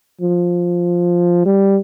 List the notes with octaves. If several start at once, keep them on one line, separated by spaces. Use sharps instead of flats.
F3
G3